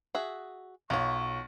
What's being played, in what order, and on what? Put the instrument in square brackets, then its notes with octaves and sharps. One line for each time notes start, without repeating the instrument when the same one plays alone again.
[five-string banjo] F#4 G#4 E5
[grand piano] B1 [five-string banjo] F4 C#5 [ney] C#6